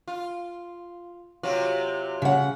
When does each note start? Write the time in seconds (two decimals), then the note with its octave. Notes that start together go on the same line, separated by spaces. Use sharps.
0.08 F4
1.43 C3 F#3 F4
2.22 C#3 F#5